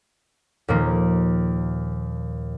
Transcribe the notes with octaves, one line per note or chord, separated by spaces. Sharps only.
D#2 A#2 F3 A#3